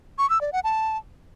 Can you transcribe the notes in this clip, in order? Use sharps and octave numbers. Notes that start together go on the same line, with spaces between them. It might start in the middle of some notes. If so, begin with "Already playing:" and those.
C#6
E6
D5
F#5
A5